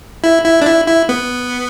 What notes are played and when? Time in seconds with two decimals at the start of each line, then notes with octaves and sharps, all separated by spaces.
0.24 E4
0.45 E4
0.62 D4
0.66 E4
0.87 E4
1.09 B3